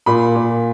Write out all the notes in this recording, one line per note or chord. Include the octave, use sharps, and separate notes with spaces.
A#2 B5
A#2